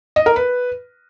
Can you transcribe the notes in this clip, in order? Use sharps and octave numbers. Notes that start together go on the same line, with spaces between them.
D#5
A#4
B4